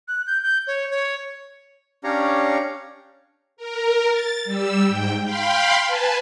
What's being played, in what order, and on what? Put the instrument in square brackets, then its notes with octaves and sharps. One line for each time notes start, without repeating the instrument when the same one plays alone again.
[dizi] F#6
G6
G6
C#5
C#5
[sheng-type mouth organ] C#4 D4 G4 C#5 F5 A#5
[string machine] A#4
A6
G3 E6
G#2 G5
F5 G5 B5 C6
B4 G#5 A5